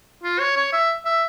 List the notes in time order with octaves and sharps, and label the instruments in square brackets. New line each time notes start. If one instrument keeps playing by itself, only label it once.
[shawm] F4
C#5
C#5
E5
E5